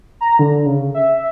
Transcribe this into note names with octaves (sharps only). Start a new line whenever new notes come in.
A#5
D3
C#3
E5